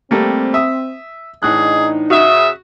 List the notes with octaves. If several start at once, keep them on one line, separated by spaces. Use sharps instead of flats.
G3 A3 A#3 C4
E5 D#6
A2 E3 D4 D#4 G#4 F#6
C#3 F#4 E5 D#6